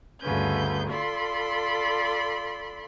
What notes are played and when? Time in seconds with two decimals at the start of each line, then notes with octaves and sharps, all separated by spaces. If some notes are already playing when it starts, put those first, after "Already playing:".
0.21 D2 G2 C#3 B4 G6
0.90 F4 A4 D5 B5 C6